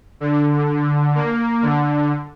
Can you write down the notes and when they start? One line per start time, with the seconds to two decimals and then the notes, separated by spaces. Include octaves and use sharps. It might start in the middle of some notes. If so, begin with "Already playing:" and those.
0.20 D3
1.15 A#3
1.63 D3